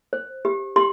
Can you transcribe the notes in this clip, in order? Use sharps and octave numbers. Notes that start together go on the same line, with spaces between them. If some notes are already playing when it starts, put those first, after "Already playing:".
C5
G4
G4 C6